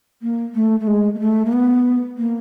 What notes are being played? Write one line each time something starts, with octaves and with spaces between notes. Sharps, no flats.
A#3
A3
A3
G#3
A#3
A3
A#3
B3
A#3